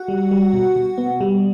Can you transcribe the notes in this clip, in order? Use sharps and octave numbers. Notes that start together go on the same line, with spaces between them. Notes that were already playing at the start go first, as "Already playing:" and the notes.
Already playing: F#4 F#5
G3
G3
B2
B2
B3
G3